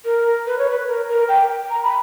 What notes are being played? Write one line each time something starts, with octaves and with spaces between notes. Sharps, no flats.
A#4
B4
C#5
B4
A#4
A#4
G5
A#5
B5